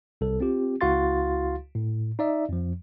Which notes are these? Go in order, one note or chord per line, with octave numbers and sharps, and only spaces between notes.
C2 A4
C4 F4 G4
C#2 E4 F#4 F5 C6 A6
A2
D#4 D5 E5
F2 F3